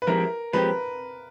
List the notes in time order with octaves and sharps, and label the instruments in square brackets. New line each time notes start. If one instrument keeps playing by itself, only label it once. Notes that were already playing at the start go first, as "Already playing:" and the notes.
[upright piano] B4
[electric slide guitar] F3 G#3 C4 E4 G4 [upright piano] A#4
[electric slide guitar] F3 G#3 C4 E4 G4 [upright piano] B4